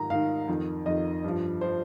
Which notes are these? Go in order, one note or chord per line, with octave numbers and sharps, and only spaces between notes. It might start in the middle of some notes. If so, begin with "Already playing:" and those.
Already playing: G#2 D#3 A#5
G#2 D#3 F5
F2 D#3
F2 D#3 D#5
G2 F3
F3 C5